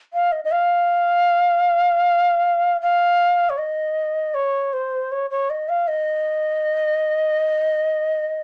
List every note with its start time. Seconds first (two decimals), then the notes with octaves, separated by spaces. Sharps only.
0.13 F5
0.32 D#5
0.45 D#5
0.52 F5
2.81 F5
3.50 C#5
3.58 D#5
4.34 C#5
4.73 C5
5.12 C#5
5.31 C#5
5.50 D#5
5.69 F5
5.88 D#5